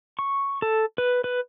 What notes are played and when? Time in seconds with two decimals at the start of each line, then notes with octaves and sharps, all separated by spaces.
0.19 C#6
0.62 A4
0.98 B4
1.24 B4